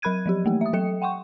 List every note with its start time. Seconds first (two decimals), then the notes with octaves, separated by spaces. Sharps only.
0.02 F#3 A#4 B5 F#6 G#6 D#7
0.26 F3 F#3 G4
0.45 E3 A3 A#3 G4
0.61 E5 D#6
0.73 F#3 A4 G5 C#7
1.02 F#5 G5 C6 C#6